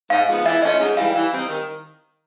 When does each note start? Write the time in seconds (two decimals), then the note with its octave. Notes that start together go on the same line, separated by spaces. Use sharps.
0.10 G#2 F5
0.28 F3 G#3 B3
0.45 E3 E5
0.62 A3 C#4 F4 D#5
0.79 G#2
0.97 E3 G3 F5
1.15 E3
1.32 G3 C4 D#4
1.48 D#3